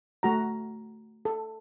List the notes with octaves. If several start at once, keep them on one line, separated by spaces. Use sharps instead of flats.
A3 F#4 A#5
A4